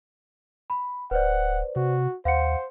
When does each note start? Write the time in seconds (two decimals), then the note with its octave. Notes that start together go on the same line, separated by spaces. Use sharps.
0.70 B5
1.11 D1 B4 C5 D5 F#5
1.76 C3 F#4
2.25 D#2 C5 F5 F#5 C#7